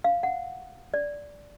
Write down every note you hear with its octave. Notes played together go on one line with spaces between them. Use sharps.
F5
F#5
D5